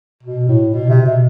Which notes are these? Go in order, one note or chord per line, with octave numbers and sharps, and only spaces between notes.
B2
A2
B2
C3
B2